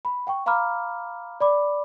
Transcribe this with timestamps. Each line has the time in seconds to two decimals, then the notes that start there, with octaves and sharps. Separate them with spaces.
0.05 B5
0.27 F#5 G5 C#6
0.46 F5 A#5 B5 D6 F6
1.41 D5 B5 D6